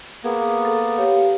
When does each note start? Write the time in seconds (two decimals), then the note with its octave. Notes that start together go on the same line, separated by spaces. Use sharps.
0.24 A#3 B3 G#4
0.65 A4
0.98 G4 C#5 F5